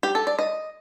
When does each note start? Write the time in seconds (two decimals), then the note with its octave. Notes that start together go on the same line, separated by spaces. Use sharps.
0.03 G4
0.15 A4
0.27 D5
0.39 D#5